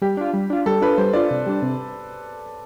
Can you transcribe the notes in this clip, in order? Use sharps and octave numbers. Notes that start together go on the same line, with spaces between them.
G3 G4
D4 F4
G3
D4 F4
G3 A4
D4 F4 B4
G3 C5
D4 F4 D5
C3
G3 D4
C3